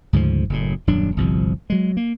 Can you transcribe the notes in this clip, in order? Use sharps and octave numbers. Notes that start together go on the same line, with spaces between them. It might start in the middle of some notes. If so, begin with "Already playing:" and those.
D2 G#2 C#3 F3
F#1 F#2 A2
D#1 F#2 F#3 D4
G1 C2 C3 F3
F#3 G#3
A#3